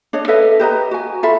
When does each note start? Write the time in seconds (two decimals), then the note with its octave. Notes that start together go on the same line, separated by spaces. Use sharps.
0.13 D4 C#5 D#5
0.28 A4 B4 D#5 E5
0.60 G4 B4 D#5 A#5
0.91 F#4 G#5
1.23 F4 A4 E5 B5